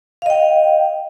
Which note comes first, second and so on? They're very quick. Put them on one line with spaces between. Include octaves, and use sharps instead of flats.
F5 D#5 G5